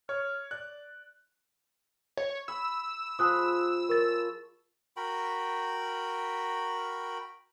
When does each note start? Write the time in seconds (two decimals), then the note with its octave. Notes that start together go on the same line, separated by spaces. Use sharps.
0.09 C#5 F6
0.51 D5 F#6
2.17 C#5
2.48 B5 E6
3.19 F3 G#4 B5 D#6 F#6
3.89 A#4 C#5 A6
4.97 F#4 A#4 G5 B5